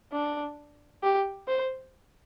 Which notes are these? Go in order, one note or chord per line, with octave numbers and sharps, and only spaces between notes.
D4
G4
C5